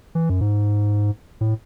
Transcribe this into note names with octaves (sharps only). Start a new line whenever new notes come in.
E3
F#2
G#2
A2